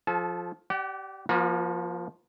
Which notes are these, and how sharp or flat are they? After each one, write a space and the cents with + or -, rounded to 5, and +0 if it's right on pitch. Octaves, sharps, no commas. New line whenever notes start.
F3 +10 A4 -20 A5 -45
G4 -20 D5 +0 F#5 +35
F3 +0 A#3 +40 F#4 -40